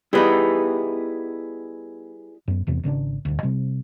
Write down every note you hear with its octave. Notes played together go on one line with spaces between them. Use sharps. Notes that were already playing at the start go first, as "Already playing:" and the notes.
G3 B3 D#4 E4 G#4 B4
F#2 B3
F1 E2 C3 B3
G#1 C#3 C#4 D4
D#1 D2
C3 G3